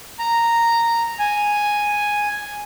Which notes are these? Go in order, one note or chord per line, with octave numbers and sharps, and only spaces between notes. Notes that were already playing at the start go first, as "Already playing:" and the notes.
A#5
G#5